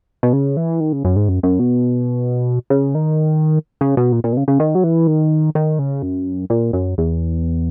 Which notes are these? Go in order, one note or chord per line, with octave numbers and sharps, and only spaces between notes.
B2
C#3
E3
D#3
C#3
F#2
G#2
F#2
F#2
B2
C#3
D#3
C#3
B2
A#2
A#2
B2
C#3
C#3
D#3
F#3
E3
D#3
D#3
C#3
F#2
A#2
F#2
E2